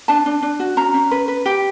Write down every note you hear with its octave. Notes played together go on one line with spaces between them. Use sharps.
D4 A5
D4
D4
F#4
C#4 A#5
C#4
B4
B4
G4